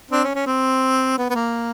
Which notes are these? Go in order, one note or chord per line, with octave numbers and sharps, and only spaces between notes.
C4 D4
C#4
C#4
C4
B3
B3
A#3